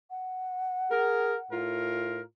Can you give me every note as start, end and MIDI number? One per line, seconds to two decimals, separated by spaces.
0.10 1.61 78
0.90 1.36 68
0.90 1.36 70
1.51 2.22 45
1.51 2.22 65
1.51 2.22 70